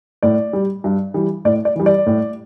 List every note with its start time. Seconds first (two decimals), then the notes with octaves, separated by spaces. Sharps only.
0.23 A2 D5
0.53 G3
0.84 G2
1.14 E3 G3
1.45 A2 D5
1.65 D5
1.76 E3 G3
1.86 D5
2.06 A2